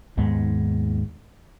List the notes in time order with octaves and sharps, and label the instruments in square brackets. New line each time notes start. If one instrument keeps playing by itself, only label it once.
[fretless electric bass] D#2 G#2 G#3 B3